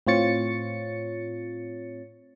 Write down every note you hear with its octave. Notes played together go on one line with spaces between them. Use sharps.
A2 C4 F4 C#5 A6 C#7